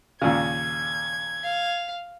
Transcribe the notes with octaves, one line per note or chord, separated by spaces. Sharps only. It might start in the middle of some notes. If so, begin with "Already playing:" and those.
D#2 A#2 C#3 G#6
F5